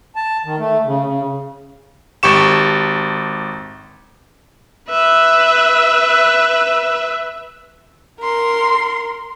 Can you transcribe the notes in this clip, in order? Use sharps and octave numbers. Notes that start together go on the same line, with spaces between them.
A5
D#3
A3
C#3
C#3
G#1 G4 C#6 E7
B4 E5
A#4 C6